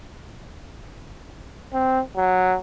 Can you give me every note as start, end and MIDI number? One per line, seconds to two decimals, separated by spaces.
1.73 2.00 60
2.16 2.56 54